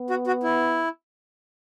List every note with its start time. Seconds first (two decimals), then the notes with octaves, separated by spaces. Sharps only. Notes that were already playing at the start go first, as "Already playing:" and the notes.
Already playing: B3
0.10 F#4
0.27 F#4
0.43 E4